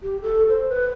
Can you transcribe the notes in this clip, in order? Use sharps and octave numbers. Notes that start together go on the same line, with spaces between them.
G4
A4
C5
B4